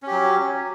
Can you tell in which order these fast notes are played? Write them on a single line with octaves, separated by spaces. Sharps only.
C#4 G4 F#3